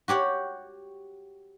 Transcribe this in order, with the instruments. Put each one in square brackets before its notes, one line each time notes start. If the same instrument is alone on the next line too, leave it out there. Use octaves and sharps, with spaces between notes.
[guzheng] F#4 G4 C#5 F#5